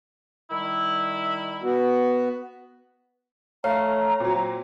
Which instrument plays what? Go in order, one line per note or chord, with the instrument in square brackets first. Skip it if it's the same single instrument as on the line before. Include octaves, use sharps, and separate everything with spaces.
[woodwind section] D#3 G3 E4
[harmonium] B3 F#4
[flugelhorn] A3 [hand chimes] C#5 [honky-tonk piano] F5 [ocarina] A#5
[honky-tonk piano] A#2 F#3 [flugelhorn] C4